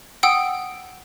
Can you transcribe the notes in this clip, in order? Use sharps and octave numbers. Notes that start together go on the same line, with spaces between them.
F#5 G5 D#6 E6 D7